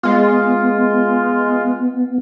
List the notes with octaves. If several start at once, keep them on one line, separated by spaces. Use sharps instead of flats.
G#3 B3 F4